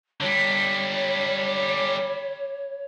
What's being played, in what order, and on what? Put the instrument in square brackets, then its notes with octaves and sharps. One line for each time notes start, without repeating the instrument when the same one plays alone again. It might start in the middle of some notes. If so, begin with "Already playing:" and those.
[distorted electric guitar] D3 G3 [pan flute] C#5